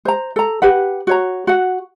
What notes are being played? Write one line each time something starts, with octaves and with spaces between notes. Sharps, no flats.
C5 A#5
A4 A#5
G4 B4 F#5
F#4 C#5 A#5
F#4 F#5